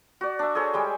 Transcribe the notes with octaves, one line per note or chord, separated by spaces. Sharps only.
F#4 D5
D4 E5
G#4 A4 C5 C#5
G3 G#3 G5